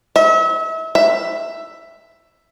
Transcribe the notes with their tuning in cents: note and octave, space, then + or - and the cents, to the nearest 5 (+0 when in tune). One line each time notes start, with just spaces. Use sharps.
E5 -35
E5 +5